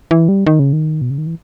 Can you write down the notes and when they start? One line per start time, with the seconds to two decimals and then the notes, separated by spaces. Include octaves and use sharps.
0.11 E3
0.29 G3
0.46 D#3
0.59 C#3
0.73 D#3
1.01 B2
1.10 C#3
1.18 D#3
1.27 E3